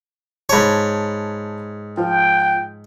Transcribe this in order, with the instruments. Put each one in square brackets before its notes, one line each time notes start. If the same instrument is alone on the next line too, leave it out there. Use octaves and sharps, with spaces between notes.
[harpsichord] G#2 C#5 [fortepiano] A5 B5
[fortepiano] F3 [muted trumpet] G5